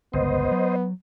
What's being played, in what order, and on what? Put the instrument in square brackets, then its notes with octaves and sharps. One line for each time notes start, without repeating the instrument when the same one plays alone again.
[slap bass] G1 C#2 [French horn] B3 [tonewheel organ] C5 D#5
[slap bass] F#3